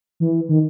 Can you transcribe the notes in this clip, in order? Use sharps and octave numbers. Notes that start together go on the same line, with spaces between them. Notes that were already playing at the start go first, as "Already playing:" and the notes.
E3
D#3